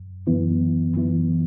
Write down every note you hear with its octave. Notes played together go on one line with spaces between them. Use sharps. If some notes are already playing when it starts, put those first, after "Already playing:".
Already playing: F#2
F#2 E3 B3 E4
F#2 E3 B3 E4